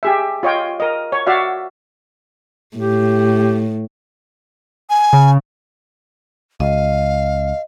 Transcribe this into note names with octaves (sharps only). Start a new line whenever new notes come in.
G4 G#4 E5
F4 C#5 D#5 G5
A#4 D#5
C#5
F#4 D5 E5 F5
A2 G4
G#5
C#3
C#2 D#5 F5